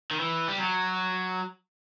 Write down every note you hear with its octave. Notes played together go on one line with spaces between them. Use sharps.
D#3
E3
G3
F#3